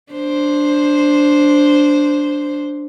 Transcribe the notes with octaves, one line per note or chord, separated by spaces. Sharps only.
D4 C5